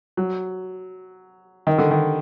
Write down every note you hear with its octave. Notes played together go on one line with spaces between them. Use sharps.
F#3
D#3
D3
D#3